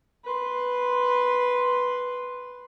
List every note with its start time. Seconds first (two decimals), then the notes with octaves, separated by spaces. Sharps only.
0.24 B4 C6